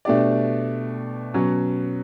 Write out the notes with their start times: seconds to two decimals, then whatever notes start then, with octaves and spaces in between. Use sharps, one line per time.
0.05 B2 A3 D4 G4 D5
1.34 B2 F#3 C#4